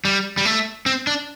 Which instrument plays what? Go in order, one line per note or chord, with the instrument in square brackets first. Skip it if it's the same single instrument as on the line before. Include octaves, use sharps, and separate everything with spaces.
[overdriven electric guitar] G3
G3
A3
C4
D4